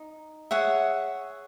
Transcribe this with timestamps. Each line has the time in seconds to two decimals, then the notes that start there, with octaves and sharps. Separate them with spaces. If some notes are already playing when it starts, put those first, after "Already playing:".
Already playing: D#4
0.51 G#4 C#5 E5 F#5